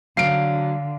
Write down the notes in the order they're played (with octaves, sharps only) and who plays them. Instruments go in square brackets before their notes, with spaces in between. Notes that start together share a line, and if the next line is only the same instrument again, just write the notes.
[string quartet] D3 [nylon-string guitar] F#3 D4 [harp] F5 [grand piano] C7 D7